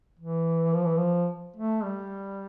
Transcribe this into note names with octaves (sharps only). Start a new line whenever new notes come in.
E3
F3
E3
F3
A3
G3